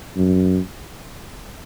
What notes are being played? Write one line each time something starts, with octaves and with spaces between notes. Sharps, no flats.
F#2